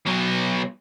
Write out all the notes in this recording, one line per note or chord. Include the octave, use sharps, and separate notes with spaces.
B2 F#3